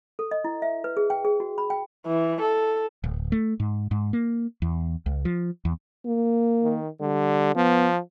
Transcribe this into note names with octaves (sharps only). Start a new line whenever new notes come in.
A4
D#5
E4
E5
B4
G#4
G5
G#4
F#4
B5
G5
E3
A4
D1
A3
G#2
G#2
A#3
E2
C#2
F3
E2
A#3
D#3
D3 G3
F3 B3